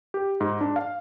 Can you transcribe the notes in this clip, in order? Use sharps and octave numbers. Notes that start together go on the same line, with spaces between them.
G4
G#2
D4
F5